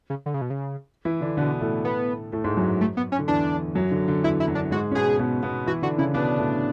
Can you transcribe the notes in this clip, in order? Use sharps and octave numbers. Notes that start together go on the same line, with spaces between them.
C#3
D3
C#3
B2
C#3
E3 E4
D3 D4
B2 D3 B3
A2 A3
B3
A2 A3
G#2 G#3
F#2 F#3
A3
B3
C#4
D3
E2 E3 D4
F#2 F#3
D3
D3
E2 E3 E4
E4
F#2 F#3
D4
G#2 G#3 F#4
C#4
B2 B3 G#4
B2 B3
B2 B3
E3 E4 F#4
D3 D4 F#4
C#3 C#4 E4
B2 B3 D4
A2 A3